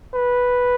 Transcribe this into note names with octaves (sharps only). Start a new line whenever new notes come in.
B4